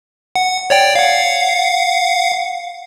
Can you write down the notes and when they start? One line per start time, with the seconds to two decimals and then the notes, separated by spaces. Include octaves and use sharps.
0.36 F#5
0.70 C#5 D5 G5
0.95 F5 F#5